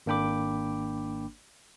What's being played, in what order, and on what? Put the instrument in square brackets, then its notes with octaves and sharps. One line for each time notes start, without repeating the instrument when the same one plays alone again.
[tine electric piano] G#1 A#3 D4 G5 B5 D6